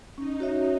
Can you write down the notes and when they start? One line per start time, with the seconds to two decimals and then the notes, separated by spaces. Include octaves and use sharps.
0.18 C#4 D#4
0.40 F#4 C#5 E5